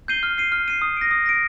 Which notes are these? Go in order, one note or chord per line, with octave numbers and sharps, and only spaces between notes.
G6 C7 D#7 G7
F6
C7 D#7
F6
C7 D#7
D#6
A#6 D7
D#6
A#6 D7